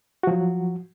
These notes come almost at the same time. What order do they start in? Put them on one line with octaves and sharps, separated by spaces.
F#4 F3 F#3